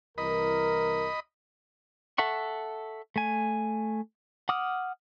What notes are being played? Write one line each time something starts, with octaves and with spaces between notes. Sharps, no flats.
C2 E3 A#4 D#5 B5
A4 E5 F#5 C#6
A3 G#5
F#5 D6 D#6 F6